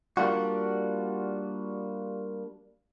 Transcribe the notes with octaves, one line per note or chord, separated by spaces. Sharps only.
G3 A#3 D4 F4 F#4